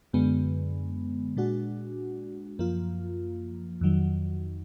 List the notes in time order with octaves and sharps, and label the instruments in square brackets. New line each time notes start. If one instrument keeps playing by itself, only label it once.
[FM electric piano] F#2 D3 G#3 B3
A#2 G#3 D4 F#4
F#2 F3 A#3 F4
F2 D#3 F#3